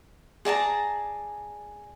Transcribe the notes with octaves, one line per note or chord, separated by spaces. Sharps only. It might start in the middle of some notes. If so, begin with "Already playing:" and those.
G#4 D5 A5 A#5